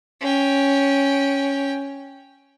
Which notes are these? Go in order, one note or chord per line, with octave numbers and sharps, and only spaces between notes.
C#4 G5